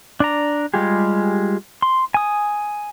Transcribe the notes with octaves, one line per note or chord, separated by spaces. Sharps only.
D4 D5 A#5
G3 G#3 F4 G4 G#4
C6
G#5 D#6